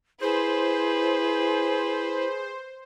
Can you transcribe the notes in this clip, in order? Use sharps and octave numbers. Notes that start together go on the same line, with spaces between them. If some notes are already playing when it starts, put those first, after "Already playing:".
E4 G#4 B4 C5